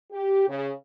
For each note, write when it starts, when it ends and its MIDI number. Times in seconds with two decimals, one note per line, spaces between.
0.12 0.48 67
0.48 0.70 49